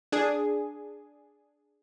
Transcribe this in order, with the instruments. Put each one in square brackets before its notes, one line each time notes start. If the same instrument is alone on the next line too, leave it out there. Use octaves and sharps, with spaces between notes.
[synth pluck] D4 G#4